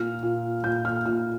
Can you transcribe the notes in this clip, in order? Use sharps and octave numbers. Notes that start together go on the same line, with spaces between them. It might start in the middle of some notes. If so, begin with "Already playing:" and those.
Already playing: A#2 F6
A#2
A#2 G6
F6
A#2 F6